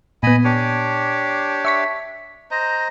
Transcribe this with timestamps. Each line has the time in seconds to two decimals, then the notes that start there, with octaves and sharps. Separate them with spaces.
0.23 A#2 B3 D#5 G#5 B5
0.44 D4 G4 C#5
1.65 E5 C#6 B6
2.51 C5 D#5 A#5